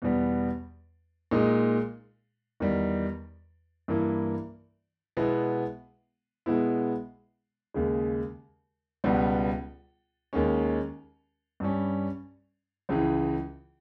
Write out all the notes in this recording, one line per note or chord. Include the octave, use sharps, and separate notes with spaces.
E2 B2 G3 B3
A#2 G#3 D#4
E2 D#3 G3
G2 E3 A#3 E4
B2 G#3 B3 E4
B2 G#3 B3 E4
D#2 C#3 G#3
C#2 B2 G3 B3
D#2 D#3 G#3 C#4
G2 G3 C#4
C#2 C#3 E3